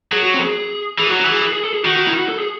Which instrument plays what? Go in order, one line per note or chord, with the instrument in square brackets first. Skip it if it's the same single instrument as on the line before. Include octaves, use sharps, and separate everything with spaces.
[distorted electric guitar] F#3 [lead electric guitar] G#4
[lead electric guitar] F#4
C4
A4
G#4
[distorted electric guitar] E3 [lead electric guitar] G#4
[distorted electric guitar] F#3 [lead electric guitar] F#4
[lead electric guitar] F#4
[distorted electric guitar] E3
[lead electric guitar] G#4
G#4
G#4
A4
G#4
[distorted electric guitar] D#3 [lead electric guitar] F#4
[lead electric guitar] F#4
E4
F#4
A4
G#4